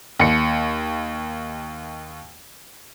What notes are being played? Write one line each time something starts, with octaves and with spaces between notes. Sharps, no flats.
D#2 C#7